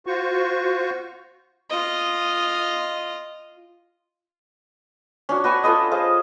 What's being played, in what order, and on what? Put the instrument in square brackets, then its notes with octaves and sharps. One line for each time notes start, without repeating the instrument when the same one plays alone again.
[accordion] F4 F#4 C5 C#6
[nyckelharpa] F4 D#5
[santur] C#4 D4 F#4
F#4 B4 F#5 G#5
F4 A4 B4 D#5
G#4 C5 F5